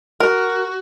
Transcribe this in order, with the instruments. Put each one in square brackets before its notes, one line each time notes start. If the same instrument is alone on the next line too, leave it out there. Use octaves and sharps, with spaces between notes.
[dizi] F#4 [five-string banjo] A#4